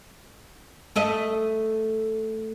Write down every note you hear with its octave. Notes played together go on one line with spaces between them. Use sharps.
A3 A4 D#5